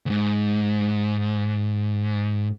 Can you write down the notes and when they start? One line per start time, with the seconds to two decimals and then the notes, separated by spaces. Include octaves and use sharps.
0.06 D2 G#2